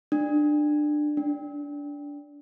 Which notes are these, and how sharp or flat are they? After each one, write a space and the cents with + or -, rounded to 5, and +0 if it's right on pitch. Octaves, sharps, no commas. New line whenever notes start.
D4 +20
D4 -20